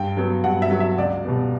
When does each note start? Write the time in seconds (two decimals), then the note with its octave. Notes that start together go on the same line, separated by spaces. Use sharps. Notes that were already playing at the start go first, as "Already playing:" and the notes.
Already playing: G2 G5
0.17 F#3 B3
0.44 G2 F#5
0.62 E5
0.71 F#3 B3
0.80 E5
0.98 C#2 D5
1.25 B2 G3 B3